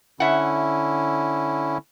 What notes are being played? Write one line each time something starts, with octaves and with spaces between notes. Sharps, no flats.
D3 C#4 E4 E5 F#5